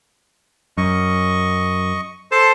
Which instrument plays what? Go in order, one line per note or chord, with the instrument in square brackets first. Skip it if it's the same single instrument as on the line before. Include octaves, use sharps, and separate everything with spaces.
[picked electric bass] F#2 [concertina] D#5 C#6
[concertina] A4 C5 A5